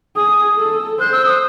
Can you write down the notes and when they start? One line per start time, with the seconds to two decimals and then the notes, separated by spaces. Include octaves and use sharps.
0.16 G#4 D#6
0.58 A4
0.99 C5 F#6
1.12 E6
1.26 D#6